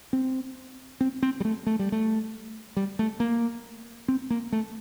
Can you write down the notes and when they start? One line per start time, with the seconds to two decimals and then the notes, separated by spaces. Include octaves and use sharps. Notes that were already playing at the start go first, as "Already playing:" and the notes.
0.13 C4
1.01 C4
1.22 C4
1.40 G3
1.45 A3
1.66 A3
1.79 G3
1.92 A3
2.77 G3
2.99 A3
3.20 A#3
4.08 C4
4.30 A#3
4.52 A3